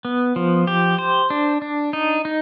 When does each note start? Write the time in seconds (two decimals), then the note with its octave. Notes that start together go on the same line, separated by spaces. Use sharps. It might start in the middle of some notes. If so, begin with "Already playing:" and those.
0.05 B3
0.36 F3
0.67 G4
0.99 C5
1.30 D4
1.62 D4
1.93 D#4
2.25 D#4